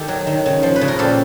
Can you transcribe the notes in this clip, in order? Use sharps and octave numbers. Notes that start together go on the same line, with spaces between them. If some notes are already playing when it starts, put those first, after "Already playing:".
Already playing: D#3 G4 A4
F#3
D#3
C#3
F3
B4
C#3
A#4
A#2 G4 A4